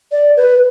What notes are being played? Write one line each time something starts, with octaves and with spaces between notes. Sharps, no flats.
D5
B4